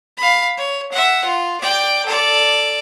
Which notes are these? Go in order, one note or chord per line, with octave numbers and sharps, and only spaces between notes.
F5 B5
C#5
E5 F#5
F4
D5 G5
A4 D5